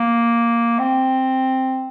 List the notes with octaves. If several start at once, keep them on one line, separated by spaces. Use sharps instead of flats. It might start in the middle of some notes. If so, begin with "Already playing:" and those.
Already playing: A#3
C4